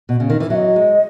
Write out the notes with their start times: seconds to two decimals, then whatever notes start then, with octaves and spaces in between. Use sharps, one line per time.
0.09 B2
0.20 C#3
0.30 D#3
0.40 E3
0.50 F#3 D#5 E5
0.76 G#3